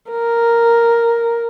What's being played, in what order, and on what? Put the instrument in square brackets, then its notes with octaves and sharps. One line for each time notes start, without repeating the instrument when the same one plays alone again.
[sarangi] A#4